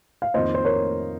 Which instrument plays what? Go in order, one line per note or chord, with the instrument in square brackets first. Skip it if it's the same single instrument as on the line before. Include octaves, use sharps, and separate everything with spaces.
[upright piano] F5
F2 D#3 A#3 C5 D#5
C5
A#4 C#5